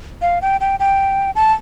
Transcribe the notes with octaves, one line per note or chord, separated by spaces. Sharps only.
F5
G5
G5
G5
A5